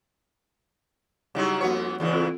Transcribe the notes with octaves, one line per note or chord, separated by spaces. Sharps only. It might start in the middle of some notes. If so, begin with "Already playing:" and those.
C#3 F#3 G3 D#4 E4 G4
F2 A#3 B3 F#4 C#5 F#5
E2 C#3 E3
C4 F4 A4